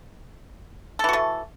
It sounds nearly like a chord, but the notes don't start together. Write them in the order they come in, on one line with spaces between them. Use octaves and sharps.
A4 E3 F#4 A3